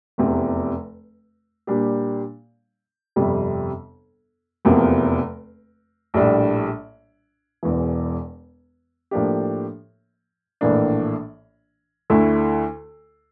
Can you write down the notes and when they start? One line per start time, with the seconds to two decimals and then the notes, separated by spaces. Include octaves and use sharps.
0.18 F1 E2 C3
1.67 A#2 G3 D4 G4
3.16 G1 F2 C3 G3
4.65 F1 E2 C3 F3 A#3
6.14 A#1 A2 G3 D4
7.63 E1 E2 E3
9.11 A2 F3 A#3 D4 G4
10.61 A#1 A2 E3 A#3 D4
12.10 D2 D3 A3 E4